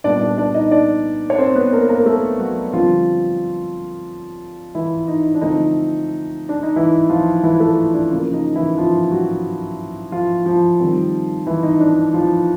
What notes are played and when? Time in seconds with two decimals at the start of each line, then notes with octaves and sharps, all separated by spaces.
0.04 A#2 G3 B3 D4 D5
0.21 D4 D5
0.38 D4 D5
0.54 D#4 D#5
0.71 D4 D5
1.30 C#5
1.38 C4 C5
1.55 B3 B4
1.72 A#3 A#4
1.89 A#3 A#4
2.00 A#4
2.06 A3 A4
2.39 F#3 F#4
2.73 D3 F3 G3 C4 F4
4.75 E3 E4
5.08 D#4
5.34 D4
5.42 D3 F3 A3 C4 D#4
6.49 D4
6.63 D#4
6.76 E3 E4
7.10 F3 F4
7.43 E3 E4
7.60 A3 A4
7.94 D4
8.11 C#3 F3 A#3
8.33 D#4
8.56 E3 E4
8.78 F3 F4
9.12 F#3 F#4
10.12 F3 F4
10.46 F3 F4
10.80 D#3 G3 C4
11.47 E3 E4
11.63 D#4
11.80 D4
12.14 F3 F4